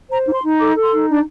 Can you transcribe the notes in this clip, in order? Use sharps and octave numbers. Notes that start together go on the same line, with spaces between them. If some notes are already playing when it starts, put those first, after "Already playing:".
C5 A#5
D#4
C6
D#4
A4 D6
A4
C6
D#4
D4